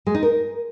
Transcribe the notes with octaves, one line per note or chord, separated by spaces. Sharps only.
G#3
D#4
A#4